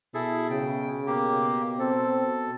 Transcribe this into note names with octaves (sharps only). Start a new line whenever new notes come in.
B2 E4 G#4 A4
C#3 G5
B2 A#3 G4
C4 A4